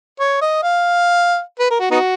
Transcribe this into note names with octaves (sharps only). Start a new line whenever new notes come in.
C#5
D#5
F5
B4
A#4
F#4
B3 D#4 F#4